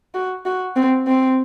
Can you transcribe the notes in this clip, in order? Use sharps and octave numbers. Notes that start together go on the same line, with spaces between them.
F#4
F#4
C4
C4